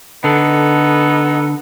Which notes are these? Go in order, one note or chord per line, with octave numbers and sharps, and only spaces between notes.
D3 B3 D#4 A4